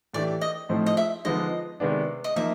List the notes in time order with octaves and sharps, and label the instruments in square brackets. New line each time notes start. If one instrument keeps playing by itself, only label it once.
[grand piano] A2 E3 A3 D4 G4 [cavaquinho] D5
[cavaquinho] D#5
[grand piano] A2 F3 A3 C4 D#4
[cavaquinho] D#5
E5
[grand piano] D3 F3 G#3 B3 D#4 [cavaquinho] D#5
[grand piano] C3 D#3 G#3 B3 D4
[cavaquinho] D#5
[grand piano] F3 A#3 D#4 [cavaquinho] E5